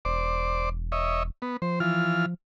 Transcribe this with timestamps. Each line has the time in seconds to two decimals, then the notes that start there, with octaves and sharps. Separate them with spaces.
0.05 E1 C5 D5 D6
0.92 C#5 D#5 E5
1.42 B3
1.62 F3 C5
1.80 E3 F4 F6